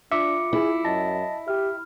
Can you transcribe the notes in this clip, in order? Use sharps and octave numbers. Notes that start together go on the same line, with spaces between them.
D4 F4 E5 D6 C#7
E4 G#4
F#2 D#5 A5 A#6
G4 E5 F6